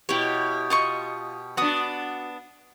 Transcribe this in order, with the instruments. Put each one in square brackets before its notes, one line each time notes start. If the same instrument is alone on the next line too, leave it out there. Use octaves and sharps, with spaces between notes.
[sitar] B2 G4 [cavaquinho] E4 C#5
[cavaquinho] F4 D#5 C#6
[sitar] B3 D4 [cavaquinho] F#4 D#6